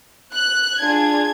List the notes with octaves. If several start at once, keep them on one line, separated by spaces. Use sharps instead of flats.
F#6
D4 F4 G#4 G#6